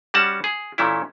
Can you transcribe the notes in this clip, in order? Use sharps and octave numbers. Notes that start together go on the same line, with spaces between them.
G3 C#4 F#4 F#5 A5
G#4
A#2 E3 A3 C#4 E4